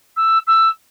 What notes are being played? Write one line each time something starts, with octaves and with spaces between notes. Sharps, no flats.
E6
E6